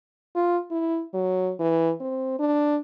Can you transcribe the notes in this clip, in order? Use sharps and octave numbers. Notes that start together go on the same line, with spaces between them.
F4
E4
F#3
E3
C4
D4